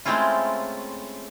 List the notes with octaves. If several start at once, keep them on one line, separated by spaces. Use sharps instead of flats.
G#3 A3 C4 C#4 E4 F4